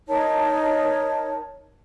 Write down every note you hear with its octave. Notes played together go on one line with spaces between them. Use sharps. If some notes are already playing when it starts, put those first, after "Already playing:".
D#4 A#4 C#5 A5